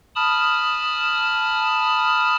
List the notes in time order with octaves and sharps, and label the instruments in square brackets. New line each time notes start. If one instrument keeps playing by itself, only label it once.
[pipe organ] A5 B5 D#6 F6